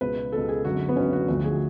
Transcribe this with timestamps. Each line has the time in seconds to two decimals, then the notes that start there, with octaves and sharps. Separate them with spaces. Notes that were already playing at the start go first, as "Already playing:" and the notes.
0.01 C#2 B2 B4
0.32 C#2 B2 A4
0.49 G#4
0.64 G#1 F#2 D3 F#4
0.89 B3
0.96 G#1 F#2 D3 C#4
1.13 F#4
1.28 D2 D3 F3 F#4
1.44 G#4